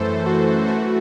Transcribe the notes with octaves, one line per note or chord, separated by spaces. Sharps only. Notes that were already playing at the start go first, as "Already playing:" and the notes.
Already playing: F#2 E3 A3 A4 C5
F#4
E3 A3 F#4